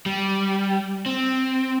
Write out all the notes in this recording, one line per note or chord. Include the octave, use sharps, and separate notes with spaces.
G3
C4